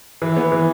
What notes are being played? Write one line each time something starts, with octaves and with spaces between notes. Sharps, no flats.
E3
B3
E3